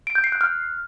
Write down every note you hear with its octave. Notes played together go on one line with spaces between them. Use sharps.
D7
G6
C7
F#6
F6